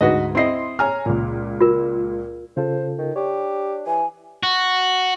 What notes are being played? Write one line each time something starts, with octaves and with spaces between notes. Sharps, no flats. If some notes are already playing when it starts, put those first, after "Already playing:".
D2 G#2 F#4 G#4 B4 D#5
C4 E4 D#5 C6 C7
C#5 G#5 A#5 F6
C#2 A#2
F4 A#4
C#3 F4 A4 C5
D#3
D4 G4 C#5
E3 G#5
F#4